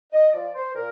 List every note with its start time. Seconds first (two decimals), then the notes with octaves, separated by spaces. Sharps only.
0.13 D#5
0.33 F3 D5
0.54 C5
0.73 A#2 A#4